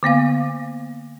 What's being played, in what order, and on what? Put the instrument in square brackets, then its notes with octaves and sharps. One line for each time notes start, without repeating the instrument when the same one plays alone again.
[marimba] D3 A#3 B3 F5